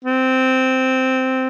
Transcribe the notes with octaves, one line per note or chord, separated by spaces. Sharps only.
C4